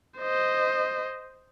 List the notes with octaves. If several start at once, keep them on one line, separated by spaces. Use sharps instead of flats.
C5 D#5